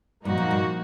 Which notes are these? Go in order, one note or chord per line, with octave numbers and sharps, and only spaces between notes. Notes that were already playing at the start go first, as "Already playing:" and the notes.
G2 A#2 F3 A#3 D#4 F#4
F#2
G2